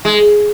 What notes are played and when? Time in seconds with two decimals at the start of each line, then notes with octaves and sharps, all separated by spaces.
0.05 G#3